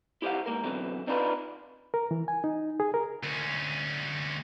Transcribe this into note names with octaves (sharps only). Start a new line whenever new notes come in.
E4 G4 C5 C#5 F5 F#5
G#2 C#3 A#3 A#4
F#2 B2 D3 E3 C4
C4 D4 D#4 F4 G4 B4
A#4
E3
G#5
D#4
G#4
A#4
D2 C#4